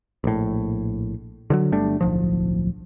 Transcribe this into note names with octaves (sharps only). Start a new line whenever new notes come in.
A#1 A2
D3 E3 F#3
G1 G3 A3 D4
D1 B1 F3